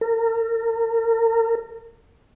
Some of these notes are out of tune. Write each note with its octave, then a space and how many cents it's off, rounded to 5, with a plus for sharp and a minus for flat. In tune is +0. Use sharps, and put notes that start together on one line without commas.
A#4 -35